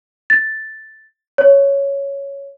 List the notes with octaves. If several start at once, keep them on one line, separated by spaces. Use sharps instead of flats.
A6
C#5